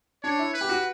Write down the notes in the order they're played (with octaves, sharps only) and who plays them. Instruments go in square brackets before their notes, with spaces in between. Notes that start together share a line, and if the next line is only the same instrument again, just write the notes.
[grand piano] D4 [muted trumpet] C#5
[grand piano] E4
[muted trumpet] B4
[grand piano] G4
F#4